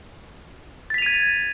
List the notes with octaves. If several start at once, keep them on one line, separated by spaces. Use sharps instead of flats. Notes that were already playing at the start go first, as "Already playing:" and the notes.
G#6 A6 B6 D#7 F7